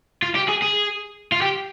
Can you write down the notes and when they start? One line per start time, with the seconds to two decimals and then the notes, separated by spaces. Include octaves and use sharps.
0.22 F4
0.35 G4
0.49 G#4
0.62 G#4
1.32 F4
1.42 G4